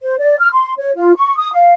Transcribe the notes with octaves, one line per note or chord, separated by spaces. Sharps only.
C5
D5
F6
C6
C#5
F4
C#6
D#6
F5